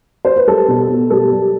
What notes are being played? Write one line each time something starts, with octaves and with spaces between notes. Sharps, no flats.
C5
B4
G3 A4
B2
B2
G3 A4
G3